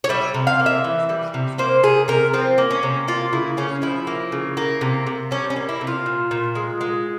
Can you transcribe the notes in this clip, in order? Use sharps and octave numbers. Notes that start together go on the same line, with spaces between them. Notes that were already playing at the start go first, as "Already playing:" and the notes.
C#5
G3 E5
C3
F5
A#3
E5
E3
G3
C3
A#3 C5
C3 G#4
C3 A#4
F3 C4
A#3
C#4
C3
A#3 F4
C#3 E4
C#3 C#4
F3 E4
A#3
C#3
A#3
C3
C3
G3 C#4
C#4
A#3
E4
C3
F4
A#2
A#2
G#3
G#3